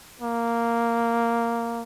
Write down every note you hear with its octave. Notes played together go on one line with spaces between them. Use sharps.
A#3